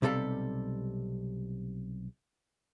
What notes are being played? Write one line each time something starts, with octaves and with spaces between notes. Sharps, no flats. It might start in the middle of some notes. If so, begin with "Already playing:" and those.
B1 C3 G3 A4 F5